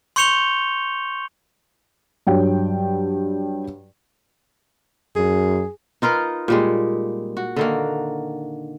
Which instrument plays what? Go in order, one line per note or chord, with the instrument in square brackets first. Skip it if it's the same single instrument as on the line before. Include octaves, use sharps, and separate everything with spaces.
[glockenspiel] C6 C#6 G6 C#7 F7 G7
[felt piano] G2 F#3 G5
[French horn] F#2 [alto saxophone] G#4
[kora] D#4 F4 A#4 B4
A#2 G3 G#3
F#4
D3 D#3 A#3